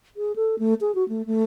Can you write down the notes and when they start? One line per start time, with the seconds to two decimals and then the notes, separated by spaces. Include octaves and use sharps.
0.17 G#4
0.36 A4
0.59 A3
0.81 G#4
0.95 F#4
1.09 A3
1.26 A3